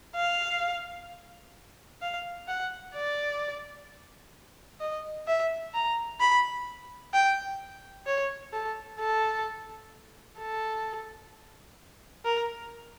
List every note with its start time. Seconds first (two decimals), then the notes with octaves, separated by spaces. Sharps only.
0.15 F5
2.02 F5
2.48 F#5
2.94 D5
4.80 D#5
5.27 E5
5.74 A#5
6.20 B5
7.13 G5
8.06 C#5
8.53 A4
8.99 A4
10.39 A4
12.25 A#4